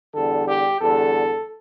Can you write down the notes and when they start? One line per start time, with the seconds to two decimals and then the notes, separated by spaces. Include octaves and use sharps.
0.14 E2 D3 G3 A4
0.48 G4
0.81 E2 D3 G3 A4